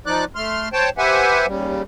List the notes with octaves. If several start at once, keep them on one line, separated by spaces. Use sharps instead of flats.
F3 D#4 D5 D6 F#6
A3 C6 F6
C5 C#5 G5 A5
G4 B4 C5 E5 F#5 G#5
D#2 C#3 G3